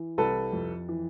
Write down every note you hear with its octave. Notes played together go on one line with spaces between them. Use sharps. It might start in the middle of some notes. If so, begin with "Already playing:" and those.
Already playing: E3
C2 A4 B4
F2
E3